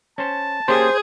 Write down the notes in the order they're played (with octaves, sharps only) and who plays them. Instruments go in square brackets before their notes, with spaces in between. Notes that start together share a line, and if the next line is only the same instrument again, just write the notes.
[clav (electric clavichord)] C#4 C5 [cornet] A5
[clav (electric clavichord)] A#3 C#4 G4 [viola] G#4 [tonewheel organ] C5